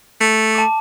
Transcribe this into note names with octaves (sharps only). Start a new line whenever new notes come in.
A3
A5 D6